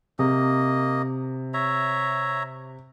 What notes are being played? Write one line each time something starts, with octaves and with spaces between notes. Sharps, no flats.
C3 A#3 D#5
C#5 E5 A#5